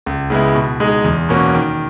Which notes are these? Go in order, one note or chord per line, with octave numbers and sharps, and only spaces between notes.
C#2
C#3 G#3 B3 E4
B2
G#3 D#4 G#4
E2
B2 A#3 C#4 F#4
D#3